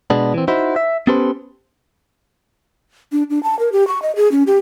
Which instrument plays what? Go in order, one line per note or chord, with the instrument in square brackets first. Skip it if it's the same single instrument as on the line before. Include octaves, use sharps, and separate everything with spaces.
[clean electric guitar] B2 G#3 B3 D4
E3 C4
D#4 E4 F#4 C5
E5
B3 C#4 G4 A4 B4 C5
[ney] D4
D4
A5
A#4
G4
C#6
D#5
G#4
C#4
G4